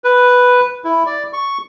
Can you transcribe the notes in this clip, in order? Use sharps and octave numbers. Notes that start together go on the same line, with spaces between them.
B4
E4
D5
C#6